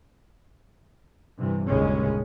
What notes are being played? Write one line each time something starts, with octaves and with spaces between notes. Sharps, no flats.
G2 C3 E3
G1 D#2 A#2 C#3 G#3 C#4